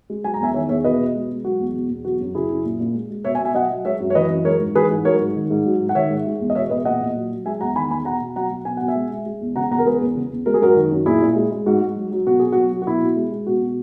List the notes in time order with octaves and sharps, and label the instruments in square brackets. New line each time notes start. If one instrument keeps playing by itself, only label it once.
[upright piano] G#3
F#3 G#5
A#5
E2 E5 G#5
D#3 C#5 E5
E2 C#5 E5
B2 B4 D#5
B2
G#3
G#3
F#3 F#4
E2
B2
E2
F#3 F#4
F#2
C#3 E4 G#4
F#2
A#2
A#2
G#3
G#3
B2 C#5 E5
E5 G#5
B2
E5 G#5
F#3 D#5 F#5
F#3
G#3 C#5 E5
F#2
C#5
E3 B4 D#5
F#2
G#3 A#4 C#5
G#2
E3 G#4 B4
G#2
F#3 A#4 C#5
G#2
D#3
G#2
F#3
G#2
F#5
D#3 C#5 E5
G#2
G#3
E2
D#5
B2 C#5 E5
E2 B4 D#5
A#2 D#5 F#5
A#2
F#3
F#3
G#3 E5 G#5
E2 F#5 A#5
D#3 G#5 B5
E2 G#5 B5
B2 F#5 A#5
B2
F#3 F#5 A#5
F#3
B2 G#5
B2 F#5
E5 G#5
G#3
G#3
G#3
E2
C#3 F#5 A#5
E2 F#5 A#5
A#4
G#3 G#4 B4
E2
C#3
E2
G#3 A#4
G#4
F#2 F#4 A#4
D#3
F#2
A#2 E4 G#4
A#2
G#3
G#3
G#2 F#4
G#2
F#3
F#3
B2 F#4
B2 G#4
F#3 F#4
F#3
F#4
B2 E4
B2
G#3
G#3
B2 F#4
B2